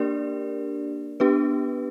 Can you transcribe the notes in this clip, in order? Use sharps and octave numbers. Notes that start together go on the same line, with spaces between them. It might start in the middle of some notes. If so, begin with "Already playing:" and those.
Already playing: A#3 D4 G4 A#4 D5
B3 D4 G4 B4